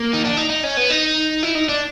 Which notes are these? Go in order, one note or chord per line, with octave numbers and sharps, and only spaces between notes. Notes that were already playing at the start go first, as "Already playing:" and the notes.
Already playing: A#3
D#4
D4
D#4
D#4
C#4
B3
D#4
E4
D#4
D4